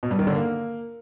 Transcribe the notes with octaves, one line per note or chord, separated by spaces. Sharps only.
B2
G2
D#3
D3
A#3